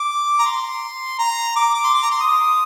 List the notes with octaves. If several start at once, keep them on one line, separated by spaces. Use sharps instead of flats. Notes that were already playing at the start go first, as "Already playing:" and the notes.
Already playing: D6
A#5
C6
A#5
D6
D6
C6
D6
A#5
C6
D#6